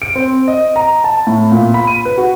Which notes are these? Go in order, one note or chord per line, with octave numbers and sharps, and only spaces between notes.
D7
C4
D#5
A#5
A5
A2
A#2
B5
D#7
B4
F#4